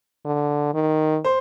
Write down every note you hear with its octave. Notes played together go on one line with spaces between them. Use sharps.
D3
D#3
C5